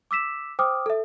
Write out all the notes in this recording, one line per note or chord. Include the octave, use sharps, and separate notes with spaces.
D6 E6 B6 E7
C5 G5 D6 D#6 F6
A4 E5